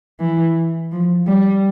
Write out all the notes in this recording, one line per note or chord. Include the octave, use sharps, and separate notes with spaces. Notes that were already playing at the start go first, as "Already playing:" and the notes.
E3
F3
G3